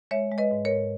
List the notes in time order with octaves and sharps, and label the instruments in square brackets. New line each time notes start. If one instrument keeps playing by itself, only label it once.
[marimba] G#3 C#5 E5
G#3
B4 D#5
G#2
A#4 C#5
G#2